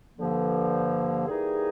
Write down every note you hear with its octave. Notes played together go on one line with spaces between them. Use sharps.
G2 D3 F3 A#3
E3 G3 A#3 D#4 G#4